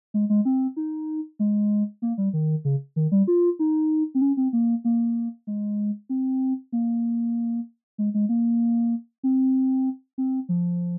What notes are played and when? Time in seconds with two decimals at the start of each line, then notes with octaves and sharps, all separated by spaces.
0.14 G#3
0.30 G#3
0.45 C4
0.77 D#4
1.39 G#3
2.02 A#3
2.18 G3
2.33 D#3
2.65 C#3
2.96 D#3
3.12 G3
3.27 F4
3.59 D#4
4.15 C4
4.21 C#4
4.37 C4
4.53 A#3
4.84 A#3
5.47 G#3
6.09 C4
6.72 A#3
7.98 G#3
8.14 G#3
8.29 A#3
9.23 C4
10.18 C4
10.49 F3